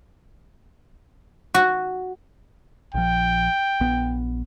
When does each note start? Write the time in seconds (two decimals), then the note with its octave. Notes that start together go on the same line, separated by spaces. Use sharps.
1.54 F#4
2.94 A#1 F3 G5
3.80 A#1 B3